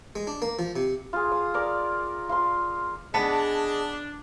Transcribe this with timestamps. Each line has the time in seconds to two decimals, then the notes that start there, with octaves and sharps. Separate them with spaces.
0.16 G#3
0.27 D4
0.42 A#3
0.59 F3
0.76 C3
1.13 F4 G#4
1.31 D#6
1.54 A#4 D5
2.29 F4 C6
3.14 B3 D4 G#4 D#5 A5